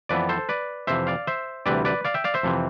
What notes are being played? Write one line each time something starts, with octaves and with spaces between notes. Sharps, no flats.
F2 E3 B3 B4 D5
A4 C5
B4 D5
F2 C3 E3 C5 E5
D5 F5
C5 E5
D2 C3 E3 G3 B4 D5
B4 D5
D5 F5
E5 G5
D5 F5
C5 E5
F2 C3 E3